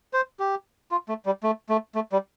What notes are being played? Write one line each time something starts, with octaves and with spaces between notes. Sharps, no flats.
C5
G4
F4
A3
G3
A3
A3
A3
G3